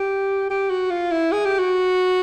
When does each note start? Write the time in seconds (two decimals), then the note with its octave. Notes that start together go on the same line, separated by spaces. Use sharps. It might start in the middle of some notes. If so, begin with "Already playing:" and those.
Already playing: G4
0.50 G4
0.70 F#4
0.90 F4
1.11 E4
1.32 G#4
1.45 G4
1.59 F#4